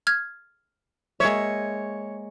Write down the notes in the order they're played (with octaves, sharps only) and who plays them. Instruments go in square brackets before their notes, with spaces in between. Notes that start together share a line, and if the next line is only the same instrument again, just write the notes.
[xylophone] F6 G#6
[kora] G#3 A#3 E5 [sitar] C#5